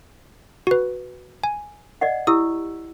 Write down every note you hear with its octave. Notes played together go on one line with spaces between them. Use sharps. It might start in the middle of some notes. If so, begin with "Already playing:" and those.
F#4 B4
G#5
D5 D#5 F#5
E4 G4 D#6 E6